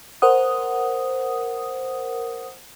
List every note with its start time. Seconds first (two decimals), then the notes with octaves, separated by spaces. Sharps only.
0.22 A#4 C5 F#5 D#6